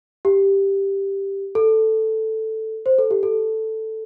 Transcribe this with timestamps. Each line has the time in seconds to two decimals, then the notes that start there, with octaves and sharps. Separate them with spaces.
0.25 G4
1.55 A4
2.86 C5
2.99 A4
3.11 G4
3.23 A4